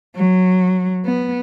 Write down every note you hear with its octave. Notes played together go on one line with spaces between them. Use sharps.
F#3
B3